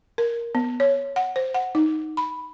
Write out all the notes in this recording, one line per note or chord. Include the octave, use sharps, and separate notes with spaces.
A#4
B3
C#5
F#5
C5
F#5
D#4
B5